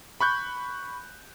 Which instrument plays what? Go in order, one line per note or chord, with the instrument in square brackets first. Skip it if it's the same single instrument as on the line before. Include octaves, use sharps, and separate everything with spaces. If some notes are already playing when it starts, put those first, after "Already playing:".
[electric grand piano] B5 C#6 F#6 G6